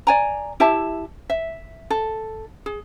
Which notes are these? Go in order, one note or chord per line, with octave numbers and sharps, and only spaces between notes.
D5 G#5 A#5
E4 G4 E5 A5
E5
A4
G#4